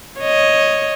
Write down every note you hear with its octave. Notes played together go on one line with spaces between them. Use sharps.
C#5 D#5